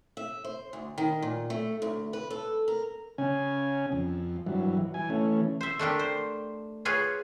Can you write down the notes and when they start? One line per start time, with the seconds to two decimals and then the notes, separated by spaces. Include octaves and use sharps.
0.17 E5
0.44 C5
0.73 D2
0.98 D#3
1.22 A#2
1.50 A3
1.82 D2
2.13 B4
2.30 A4
2.68 A#4
3.18 C#3 C#4 G#5
3.92 F2
4.46 G2 E3 F#3
4.94 E3 G#5
5.10 E3 A3 C#4
5.61 C5 E5
5.79 A3 D4 G4 A#4
5.99 C5
6.85 F4 G#4 B4 C#5